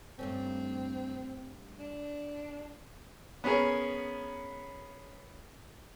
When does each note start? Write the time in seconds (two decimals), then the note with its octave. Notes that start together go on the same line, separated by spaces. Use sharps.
0.19 G2 A3 C4 C#4
1.79 D4
3.44 B3 C#4 G#4 A#4 C#5